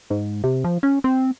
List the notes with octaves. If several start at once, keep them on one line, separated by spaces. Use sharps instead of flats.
G#2
C3
F3
C#4
C4